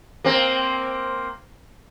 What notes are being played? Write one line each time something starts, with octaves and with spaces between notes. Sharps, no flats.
A#3 C4